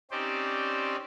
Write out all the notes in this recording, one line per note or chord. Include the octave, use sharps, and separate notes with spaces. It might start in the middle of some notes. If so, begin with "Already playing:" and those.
C4 C#4 D#4 G4 C5 D5